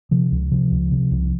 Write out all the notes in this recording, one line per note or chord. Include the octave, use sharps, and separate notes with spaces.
C3 F3
C#2
C3 F3
C#2
C3
C2